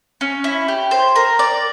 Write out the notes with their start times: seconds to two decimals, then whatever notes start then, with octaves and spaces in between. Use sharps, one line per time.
0.21 C#4
0.44 E4
0.68 G4
0.91 C5
1.16 A#4
1.39 D5